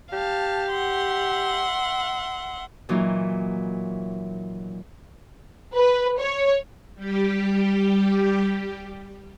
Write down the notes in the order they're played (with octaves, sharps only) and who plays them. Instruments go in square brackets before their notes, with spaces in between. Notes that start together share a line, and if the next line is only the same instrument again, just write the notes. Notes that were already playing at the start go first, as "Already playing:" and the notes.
[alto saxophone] G4 [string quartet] F5 A5
[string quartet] E5 F#5 C6
[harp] A#2 E3 F#3 D#4 F4
[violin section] B4
C#5
[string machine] G3 G4